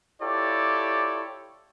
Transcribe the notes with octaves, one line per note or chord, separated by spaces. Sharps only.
E4 F4 G4 A4 C#5 D5